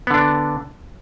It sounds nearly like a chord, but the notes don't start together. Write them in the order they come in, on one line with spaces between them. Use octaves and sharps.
B3 D3 D4